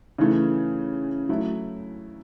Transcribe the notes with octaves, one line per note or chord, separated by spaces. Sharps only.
C#3 E3 A3
F#3 A3 E4